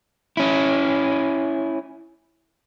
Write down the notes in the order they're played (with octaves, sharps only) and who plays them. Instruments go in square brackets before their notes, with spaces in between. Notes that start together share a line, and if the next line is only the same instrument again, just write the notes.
[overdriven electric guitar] C#4 E4